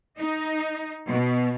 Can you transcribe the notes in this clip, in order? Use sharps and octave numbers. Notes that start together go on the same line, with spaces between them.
D#4
B2